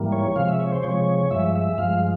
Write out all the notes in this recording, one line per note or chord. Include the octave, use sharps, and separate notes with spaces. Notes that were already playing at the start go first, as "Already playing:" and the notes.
Already playing: G#2 E3 G3 A#3
C#5
C3 F3 G#3 F5
E5
C#5
C5
C3 F3 G#3 C#5
G2 F3 G#3 E5
E5
G2 F3 G#3 F5